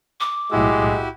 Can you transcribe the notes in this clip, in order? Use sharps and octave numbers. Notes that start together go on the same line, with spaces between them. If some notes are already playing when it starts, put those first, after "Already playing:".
D6
B1 A2 G#3 E4 F#4 G4 E6